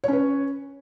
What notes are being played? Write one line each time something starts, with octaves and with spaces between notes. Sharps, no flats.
C#4 B4 C#5